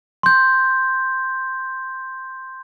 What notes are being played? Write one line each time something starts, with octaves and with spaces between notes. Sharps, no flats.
C6 G6